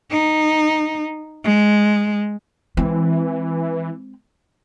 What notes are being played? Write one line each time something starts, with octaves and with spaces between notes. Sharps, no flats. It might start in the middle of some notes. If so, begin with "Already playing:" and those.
D#4
G#3
E3 G#3 C4